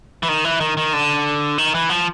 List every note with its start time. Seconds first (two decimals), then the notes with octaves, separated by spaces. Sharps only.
0.23 E3
0.29 D#3
0.44 E3
0.61 D#3
0.77 D#3
0.93 D3
1.58 D#3
1.74 E3
1.89 F3